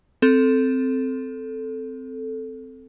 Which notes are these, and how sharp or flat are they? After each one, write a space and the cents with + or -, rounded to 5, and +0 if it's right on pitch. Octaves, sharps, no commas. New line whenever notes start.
C4 -10 A4 +0